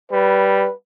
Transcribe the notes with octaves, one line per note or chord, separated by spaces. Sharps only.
G3 B4